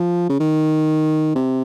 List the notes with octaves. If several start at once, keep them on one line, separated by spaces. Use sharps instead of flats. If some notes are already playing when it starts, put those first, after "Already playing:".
Already playing: F3
C#3
D#3
C3